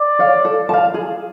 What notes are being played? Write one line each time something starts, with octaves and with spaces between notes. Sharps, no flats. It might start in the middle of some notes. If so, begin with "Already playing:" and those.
Already playing: D5
C#5 F5
A4
A5
F5
G#4